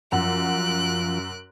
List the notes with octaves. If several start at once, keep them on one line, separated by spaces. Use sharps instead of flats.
F#2 F3 F#5 F#6 D7